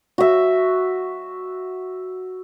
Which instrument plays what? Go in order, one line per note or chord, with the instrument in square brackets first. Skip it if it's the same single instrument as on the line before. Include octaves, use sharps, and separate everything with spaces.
[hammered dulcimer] F#4 E5